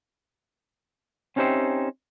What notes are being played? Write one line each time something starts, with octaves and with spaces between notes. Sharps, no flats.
C4 C#4 D#4 G4 C5 E5